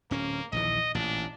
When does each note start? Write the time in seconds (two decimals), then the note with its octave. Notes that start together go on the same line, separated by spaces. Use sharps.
0.11 D1 A#3 C#4
0.52 A#1 D#2 E3 D#5
0.95 A1 A#2 D4